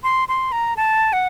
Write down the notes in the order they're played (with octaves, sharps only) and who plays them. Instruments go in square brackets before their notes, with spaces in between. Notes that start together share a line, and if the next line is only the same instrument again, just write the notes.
[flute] C6
C6
A#5
A5
F#5